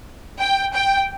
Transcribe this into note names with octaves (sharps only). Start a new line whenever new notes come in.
G5
G5